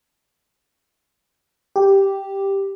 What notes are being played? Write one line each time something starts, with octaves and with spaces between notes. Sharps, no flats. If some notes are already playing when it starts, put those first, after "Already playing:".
G4